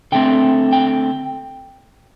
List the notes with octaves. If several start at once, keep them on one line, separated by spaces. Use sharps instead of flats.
D3 A3 C4 G5
G5